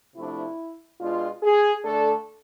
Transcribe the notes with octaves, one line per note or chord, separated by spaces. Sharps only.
C3 F3 A3 D4 E4
B2 G#3 D4 F4
G#4
D3 A3 D4 A4